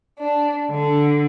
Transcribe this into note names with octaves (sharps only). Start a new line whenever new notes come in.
D4
D3